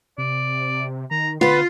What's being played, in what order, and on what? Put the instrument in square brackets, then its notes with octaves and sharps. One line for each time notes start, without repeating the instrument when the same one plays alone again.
[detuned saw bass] C3 [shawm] D5
[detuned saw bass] D#3 [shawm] A#5
[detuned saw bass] D3 [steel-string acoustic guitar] B3 B4 [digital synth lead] F4 [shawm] C6